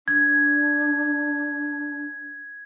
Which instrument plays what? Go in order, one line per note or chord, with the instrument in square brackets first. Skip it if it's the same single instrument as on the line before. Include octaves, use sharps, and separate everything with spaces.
[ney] D4 [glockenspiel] G#6